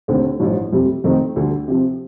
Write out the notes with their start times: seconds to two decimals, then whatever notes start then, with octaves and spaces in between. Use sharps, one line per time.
0.08 D#2 D3 A3 C4
0.40 A1 G2 F3
0.73 F2 C3 G3
1.04 F2 D#3 A3 C4 D#4
1.36 D2 D3 G3
1.68 C3 F3 C4